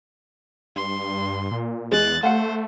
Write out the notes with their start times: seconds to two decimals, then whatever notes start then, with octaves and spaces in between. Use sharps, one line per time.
0.76 G2 C6
1.51 A#2
1.92 E2 G#3 F#6 A6
2.23 A3 C5 F5 F#5